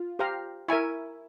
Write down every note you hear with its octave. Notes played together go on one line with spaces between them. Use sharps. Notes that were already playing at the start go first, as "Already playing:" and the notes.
Already playing: F4
G4 C5 F5 A#5
E4 A#4 E5 G#5 C#6